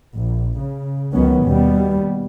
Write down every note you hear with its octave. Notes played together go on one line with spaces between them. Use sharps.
A#1
C#3
C#2 D#3 F#3 B3 C#4
D#2 B2 G3 B3